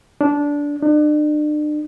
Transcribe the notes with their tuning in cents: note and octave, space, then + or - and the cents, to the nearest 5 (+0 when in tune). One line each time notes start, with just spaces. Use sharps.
D4 -15
D4 +40